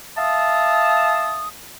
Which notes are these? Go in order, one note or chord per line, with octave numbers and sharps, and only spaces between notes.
E5 F5 A5 D#6